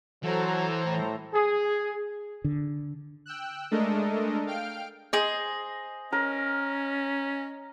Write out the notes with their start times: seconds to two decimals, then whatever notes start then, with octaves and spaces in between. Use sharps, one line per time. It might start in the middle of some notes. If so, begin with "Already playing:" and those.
0.23 E3 F#3 A4 C5 A#5
0.85 A2
1.34 G#4
2.44 D3
3.26 G5 E6 F#6
3.71 G#3 A3 D4 A4 A#4 D#5
4.47 F5 G5 F6 D7
5.13 G#4 C5 D#5
6.12 C#4 A#4